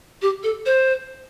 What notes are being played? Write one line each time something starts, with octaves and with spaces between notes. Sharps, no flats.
G4
A4
C5